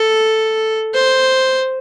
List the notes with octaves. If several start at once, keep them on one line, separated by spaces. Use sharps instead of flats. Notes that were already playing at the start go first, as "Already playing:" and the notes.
Already playing: A4
C5